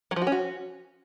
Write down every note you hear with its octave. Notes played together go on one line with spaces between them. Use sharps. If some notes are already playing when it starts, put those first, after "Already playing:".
F#3
F3
F#4
C#4
F#4